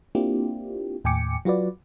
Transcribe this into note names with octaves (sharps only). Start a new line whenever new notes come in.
A#3 C4 D4 E4 F4 G4
D#2 A2 G5 G#5 D6 C#7
F#3 F4 F#4 B4 D5